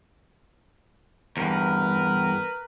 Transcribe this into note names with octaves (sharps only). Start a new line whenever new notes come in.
E2 G2 A#4 B4